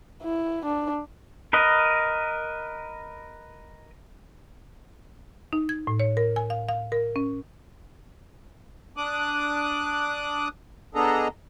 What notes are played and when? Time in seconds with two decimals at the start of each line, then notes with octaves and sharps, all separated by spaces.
0.23 E4
0.66 D4
1.53 A#4 B4 D#5
5.53 D#4
5.69 G#6
5.87 A2
6.00 C#5
6.17 A#4
6.36 G#5
6.50 F5
6.69 F5
6.92 A#4
7.16 C#4
8.97 D4 D6 D#6 F#6
10.95 B3 D4 G#4 A4 D#5 A#5